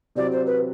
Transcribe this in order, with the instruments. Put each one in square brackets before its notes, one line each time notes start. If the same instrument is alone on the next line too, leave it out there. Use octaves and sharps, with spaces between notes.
[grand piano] C3 F#3 C4 E4 [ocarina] D5
[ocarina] C5
B4